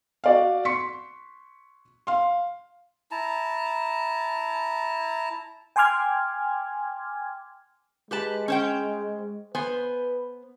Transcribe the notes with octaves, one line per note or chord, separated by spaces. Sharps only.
F#4 D5 F5
C6 C#6 B6 C#7
F5 C6
E4 A5 A#5
G5 G#5 C6 D6 F6 G#6
G#3 G4 B4 A5
C#4 C5 G5
B3 B4 C5 G#5